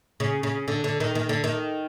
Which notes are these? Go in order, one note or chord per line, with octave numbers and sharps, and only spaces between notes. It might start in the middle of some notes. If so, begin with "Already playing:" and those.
C#3
C#3
D3
D3
D#3
D#3
D3
D#3